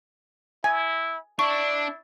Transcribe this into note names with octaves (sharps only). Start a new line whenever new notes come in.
E4 G#5
D4 E4 C#6